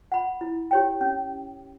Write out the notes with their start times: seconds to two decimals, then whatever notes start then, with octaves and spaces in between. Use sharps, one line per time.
0.12 F#5 B5
0.41 E4
0.71 G4 C#5 G5
1.01 C#4